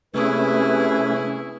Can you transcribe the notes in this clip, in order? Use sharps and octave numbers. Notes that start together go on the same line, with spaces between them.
C3 A3 C#4 E4 G#4 B4